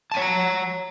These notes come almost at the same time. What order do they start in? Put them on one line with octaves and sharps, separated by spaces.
A5 G5 C#5 F#5 A#5